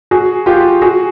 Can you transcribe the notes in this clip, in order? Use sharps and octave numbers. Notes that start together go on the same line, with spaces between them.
F#4 G#4
F4 G4
F#4 G#4